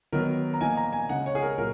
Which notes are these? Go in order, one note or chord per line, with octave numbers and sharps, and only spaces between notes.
D#3 F#3 B3 A#4
A#5
F3 A#3 D#4 G#5
A#5
G#5
C#3 G#3 D#4 F#5
C#5
G#4
A#4
A#2 F#3 A#4